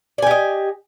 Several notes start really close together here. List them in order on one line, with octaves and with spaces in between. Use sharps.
D5 G#5 G4 D#5